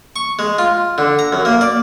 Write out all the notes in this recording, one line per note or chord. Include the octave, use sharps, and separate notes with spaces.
C#6
G#3
F4
D3
A#5
F#2
A#3
D5